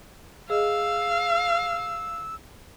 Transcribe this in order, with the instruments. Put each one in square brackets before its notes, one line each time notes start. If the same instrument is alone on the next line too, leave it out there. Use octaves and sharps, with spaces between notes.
[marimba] G#4 D#5 [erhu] F5 [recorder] E6